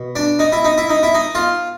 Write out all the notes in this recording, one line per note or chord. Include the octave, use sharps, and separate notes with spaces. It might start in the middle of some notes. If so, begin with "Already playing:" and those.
Already playing: B2
D4
D#4
E4
D#4
E4
D#4
E4
D#4
F4